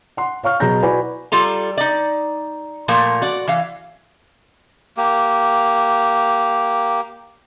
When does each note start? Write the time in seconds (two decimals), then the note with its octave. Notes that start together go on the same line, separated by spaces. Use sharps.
0.17 F#5 C6
0.44 C#5 F5 C#6 F6
0.60 B2 F#3 G#4 A#5 G6 A#6
0.83 E4 F#4 B4 D5 G#5 B5
1.32 G3 F4 A4 A#5
1.77 D#4 D5
2.88 A#2 F3 A3 A#4
3.22 F#4 D5
3.48 E3 F5
4.97 A#3 G4